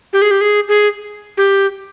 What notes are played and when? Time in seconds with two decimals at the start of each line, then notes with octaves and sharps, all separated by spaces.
0.13 G4
0.22 G#4
0.31 G4
0.41 G#4
0.68 G#4
1.37 G4